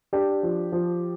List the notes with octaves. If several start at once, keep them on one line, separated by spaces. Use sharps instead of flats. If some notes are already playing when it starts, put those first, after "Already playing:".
D4 G4
F3
F3